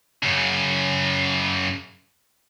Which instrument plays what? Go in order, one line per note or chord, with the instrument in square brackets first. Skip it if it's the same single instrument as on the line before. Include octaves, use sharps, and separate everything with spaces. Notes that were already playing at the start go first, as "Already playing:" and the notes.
[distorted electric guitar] F#2 C#3